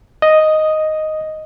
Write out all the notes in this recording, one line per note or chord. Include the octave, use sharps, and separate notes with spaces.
D#5